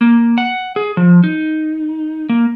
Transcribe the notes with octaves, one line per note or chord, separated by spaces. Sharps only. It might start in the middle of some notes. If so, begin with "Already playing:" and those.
A#3
F#5
G#4
F3
D#4
A#3